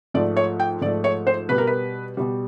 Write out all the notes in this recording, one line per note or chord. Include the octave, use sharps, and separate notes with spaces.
G#2 F3 A3 D5
C#5
G5
G#2 F3 A3 D5
C#5
C5
B2 G3 B4
A#4
B4
B2 G3